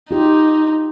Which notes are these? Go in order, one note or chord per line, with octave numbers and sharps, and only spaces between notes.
D#4 F4 G4